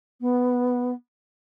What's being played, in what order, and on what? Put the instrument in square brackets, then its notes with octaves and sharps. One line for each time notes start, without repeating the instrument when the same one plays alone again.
[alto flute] B3